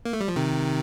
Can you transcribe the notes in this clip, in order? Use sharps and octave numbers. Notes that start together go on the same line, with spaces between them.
A#3
A3
G3
F3
C3 D#3